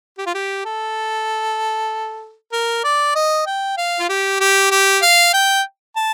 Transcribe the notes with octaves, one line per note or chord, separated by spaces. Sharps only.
G4
F4
G4
A4
A#4
D5
D#5
G5
F5
F4
G4
G4
G4
F5
G5
A5